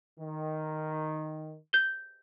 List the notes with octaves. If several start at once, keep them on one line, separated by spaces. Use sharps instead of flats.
D#3
G6 G7